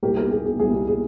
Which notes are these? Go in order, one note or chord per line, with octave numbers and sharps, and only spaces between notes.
C2 A#2 G3 G4 A#4
G4 A#4
G#4
G#4
C2 A#2 G3 G#4
G4
G#4